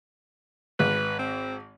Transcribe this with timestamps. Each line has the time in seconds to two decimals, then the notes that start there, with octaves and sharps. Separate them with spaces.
0.79 G#1 B4
1.19 C4